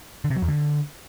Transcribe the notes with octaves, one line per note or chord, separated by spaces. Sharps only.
D3
C3
F#3
E2
D3